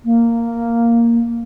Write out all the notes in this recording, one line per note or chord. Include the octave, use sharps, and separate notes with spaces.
A#3